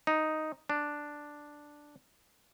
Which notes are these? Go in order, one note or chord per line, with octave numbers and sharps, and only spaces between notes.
D#4
D4